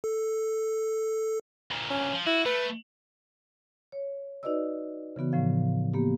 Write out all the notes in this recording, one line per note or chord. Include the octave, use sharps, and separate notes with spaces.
A4
D2 A#2
C#4
F3
E4 F#4
A3 B4
C#5
D#4 F#4 B4 D5 D#5 E6
C#3 E3 B3 F#4
A2 C#3 F3 F5
A#3 B3 G4